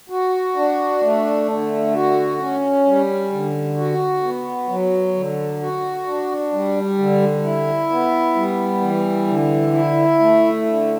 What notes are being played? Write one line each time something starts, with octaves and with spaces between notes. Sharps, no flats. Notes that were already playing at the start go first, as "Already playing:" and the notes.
F#4
D4
A3
D3
F#4
C#4
G3
D3
F#4
B3
F#3
D3
F#4
D4
G3
D3
E4
B3
G3
E3
D3
E4
A3
D3